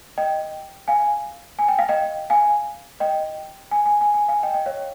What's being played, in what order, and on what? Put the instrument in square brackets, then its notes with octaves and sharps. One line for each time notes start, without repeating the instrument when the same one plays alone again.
[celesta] D#5 G5
F5 G#5
G#5
G5
F5
D#5 G5
F5 G#5
D#5 G5
G#5
G#5
G#5
G#5
F5 G#5
D#5 G5
D#5 G5
C#5 F5